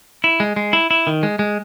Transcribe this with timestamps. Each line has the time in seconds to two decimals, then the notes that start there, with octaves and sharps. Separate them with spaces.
0.24 E4
0.40 G#3
0.56 G#3
0.73 E4
0.91 E4
1.07 D#3
1.23 G#3
1.39 G#3